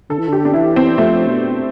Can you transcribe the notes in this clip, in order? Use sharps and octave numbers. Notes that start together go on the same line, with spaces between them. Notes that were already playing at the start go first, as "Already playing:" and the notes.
D3 A4
E3
D3 G4
D4
E3 E4
C4
F3 A3
B2